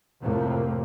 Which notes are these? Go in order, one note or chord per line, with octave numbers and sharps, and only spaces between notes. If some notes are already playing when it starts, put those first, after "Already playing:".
F2 A2 C3 F3 A3 A#3